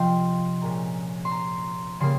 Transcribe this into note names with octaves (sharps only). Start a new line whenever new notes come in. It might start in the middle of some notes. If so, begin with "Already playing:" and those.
Already playing: C3 F3 D#5 F5 G5 C6
A#2 G#3 C#4 A#5
C6
A#5
C#3 G3 A#3 C6